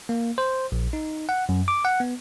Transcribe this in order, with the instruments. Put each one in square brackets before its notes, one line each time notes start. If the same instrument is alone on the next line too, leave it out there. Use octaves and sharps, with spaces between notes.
[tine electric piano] A#3
C5
A#1
D#4
F#5
F#2
D6
F#5
B3